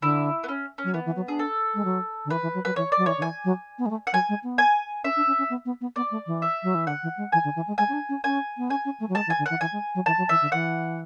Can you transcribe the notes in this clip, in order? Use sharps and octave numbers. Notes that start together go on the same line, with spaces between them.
D3 E4
B3
C#4
C#4
F#3
E3 B3
E3
F#3
D4 G#4
A4
G#3
F#3
D3
E3 B4
E3
F#3
F#3 B4
E3 C#5
D5
F#3
E3 C#5
D3
E3 G#5
F#3
B3
G#3
A3
F#5
F#3 G#5
G#3
B3
G#5
C#4 E5
D4
C#4
C#4
B3
B3
B3
B3 D5
A3
E3
E5
F#3
E3
D3 F#5
E3
G#3
E3 G#5
D3
E3
G#3
G#3 G#5
C#4
D4
C#4
C#4 G#5
B3
C#4 G#5
C#4
A3
F#3
G#3 A5
E3
G#5
D3
E3 F#5
E3 G#5
G#3
F#3
E3 A5
F#3
E3 E5
D3
E3 F#5